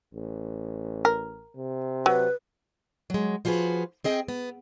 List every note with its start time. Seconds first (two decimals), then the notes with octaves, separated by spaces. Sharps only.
0.14 A1
1.05 A#4
1.57 C3
2.06 F#3 B4
3.10 F#3 G#3
3.45 F3 F4 F#4 G#4 B4
4.04 C4 G#4 D#5 G5
4.28 B3